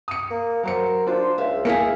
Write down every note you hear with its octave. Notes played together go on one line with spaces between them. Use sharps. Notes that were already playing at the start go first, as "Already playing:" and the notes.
D#6 C#7
A#3
F#3 A#4 C5 C#7
D4 F4 C5
C#2 E5 F5
A#3 E4 G#4 F5 B6 C#7